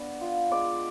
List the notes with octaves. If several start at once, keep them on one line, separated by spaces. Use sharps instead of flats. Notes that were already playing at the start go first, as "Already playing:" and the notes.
Already playing: B3 D4
F4
G#3 D5